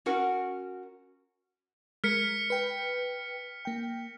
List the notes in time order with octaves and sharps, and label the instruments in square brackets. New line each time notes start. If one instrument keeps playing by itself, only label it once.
[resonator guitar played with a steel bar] C#4 F#4 A#4 F#5
[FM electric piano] G#3 A#4 [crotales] F6 B6 C#7
[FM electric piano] B4 G5
A#3 G5